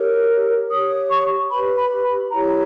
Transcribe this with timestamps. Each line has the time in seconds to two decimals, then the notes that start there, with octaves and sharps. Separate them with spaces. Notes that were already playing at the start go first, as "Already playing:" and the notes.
Already playing: G4 A#4 C#5
0.69 G4 C#5 D#6
1.10 C#6
1.49 B4 B5
1.54 G4
1.76 B5
2.04 B5
2.32 E4 G4 C#5 A#5